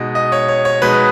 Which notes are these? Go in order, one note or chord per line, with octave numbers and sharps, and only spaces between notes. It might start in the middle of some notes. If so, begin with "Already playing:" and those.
Already playing: B2 G#3 D#4 D#5
D#5
C#5
C#5
C#5
B2 G#3 D#4 B4